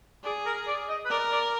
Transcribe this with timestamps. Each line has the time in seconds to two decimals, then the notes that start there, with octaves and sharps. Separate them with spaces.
0.24 G#4 D5
0.46 A#4
0.67 D5
0.89 D#5
1.05 B4
1.10 A#4 D5
1.32 D5